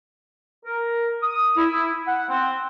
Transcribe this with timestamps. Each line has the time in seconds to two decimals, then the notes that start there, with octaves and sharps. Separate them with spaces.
0.65 A#4
1.22 D#6
1.57 E4
2.08 F#5
2.29 C4